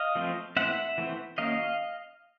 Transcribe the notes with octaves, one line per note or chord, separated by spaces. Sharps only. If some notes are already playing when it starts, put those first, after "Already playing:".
Already playing: D#5 F5
F3 A3 C4
E3 A3 C4 E5 F#5
E3 A3 C4
D#3 F#3 A#3 C#4 D#5 F5